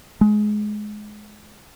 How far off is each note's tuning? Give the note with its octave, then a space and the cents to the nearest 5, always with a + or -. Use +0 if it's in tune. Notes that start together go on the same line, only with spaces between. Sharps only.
G#3 +20